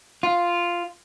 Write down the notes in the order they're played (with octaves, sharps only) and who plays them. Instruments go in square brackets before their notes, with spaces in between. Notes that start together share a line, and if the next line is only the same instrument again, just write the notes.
[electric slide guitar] F4